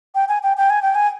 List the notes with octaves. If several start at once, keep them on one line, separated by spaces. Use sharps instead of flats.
G5
G#5
G5
G5
G#5
G5
G#5